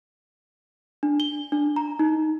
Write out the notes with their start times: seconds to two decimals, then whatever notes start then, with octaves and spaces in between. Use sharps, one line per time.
1.03 D4
1.20 G7
1.52 D4
1.76 A#5
1.99 D#4